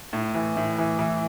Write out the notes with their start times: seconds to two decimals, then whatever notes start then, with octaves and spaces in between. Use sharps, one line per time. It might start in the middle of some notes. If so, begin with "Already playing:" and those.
0.13 A2
0.35 E3
0.57 A2
0.78 E3
0.99 E3